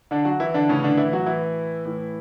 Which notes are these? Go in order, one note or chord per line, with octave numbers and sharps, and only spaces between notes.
D3 D4
F#3 F#4
E3 E4
D3 D4
A2 C#3 E3 C#4
D3 D4
E3 E4
F#3 F#4
E3 E4
A2 E3